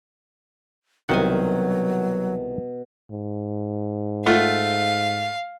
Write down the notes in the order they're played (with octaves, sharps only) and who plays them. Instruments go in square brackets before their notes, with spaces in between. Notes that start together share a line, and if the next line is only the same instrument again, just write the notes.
[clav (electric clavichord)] C2 D#3 F#5 [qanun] B2 C5 G#5 [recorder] F#3
[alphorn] G#2
[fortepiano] A3 F4 F#5 [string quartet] F5